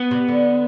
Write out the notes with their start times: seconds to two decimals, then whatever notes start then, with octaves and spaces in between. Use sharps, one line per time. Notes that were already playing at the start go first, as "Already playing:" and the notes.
Already playing: B3
0.11 C3
0.28 D3